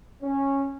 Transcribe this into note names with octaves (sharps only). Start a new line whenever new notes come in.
C#4